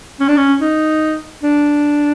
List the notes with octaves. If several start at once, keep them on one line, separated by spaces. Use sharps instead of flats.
C#4
D4
C#4
D#4
D4